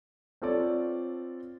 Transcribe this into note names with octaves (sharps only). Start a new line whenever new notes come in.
C4 F4 A4 C#5 D5